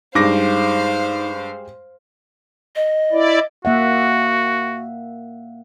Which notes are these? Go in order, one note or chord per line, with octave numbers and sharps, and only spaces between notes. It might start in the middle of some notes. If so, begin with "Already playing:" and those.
G2 G3 G#3 D#4 C5 F5 D6 A#6
D#5
E4 D5
A#3 F#4 E5 F#5